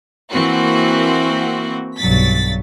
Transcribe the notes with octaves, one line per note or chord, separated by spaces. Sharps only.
E3 A#3 C4 F#4
B1 G2 F#3 A6 B6